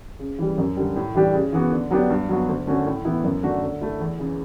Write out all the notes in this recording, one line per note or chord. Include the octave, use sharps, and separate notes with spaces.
C#3
E3 G3
F#2
D3 G3
A2
E3 G3 D4 G4
C#3
E3 B3 F#4
D3
F#3 B3 D4 G4
G2
F#3 B3 F#4
D2
D3 A3 C#4 F#4
A2
E3 B3 E4
F#2
D3 A3 D4 F#4
D3
A3 E4
E2
C#3 E3